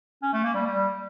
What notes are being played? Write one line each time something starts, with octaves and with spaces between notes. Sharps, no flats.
C#4
A3
A#3
G3
G3